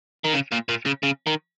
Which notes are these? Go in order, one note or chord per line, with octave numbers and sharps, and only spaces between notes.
D#3
C#3
A#2
A#2
C#3
C#3
D#3